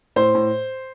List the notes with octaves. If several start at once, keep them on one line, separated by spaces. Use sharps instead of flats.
A2 C5
A2